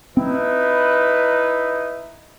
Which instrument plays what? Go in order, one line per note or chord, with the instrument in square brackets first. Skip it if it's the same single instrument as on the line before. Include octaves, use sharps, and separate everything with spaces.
[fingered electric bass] C4 [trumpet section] D#4 E4 B4